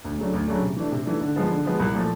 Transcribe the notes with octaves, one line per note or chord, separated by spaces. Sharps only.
D2
C#3 F#3 A3 D4
D2
C#3 F#3 A3 D4
C3
E3 A3 D4
C3
E3 A3 D4
D3
F3 G#3 B3
D3
F3 G#3 B3
C2
A#2 F3 A3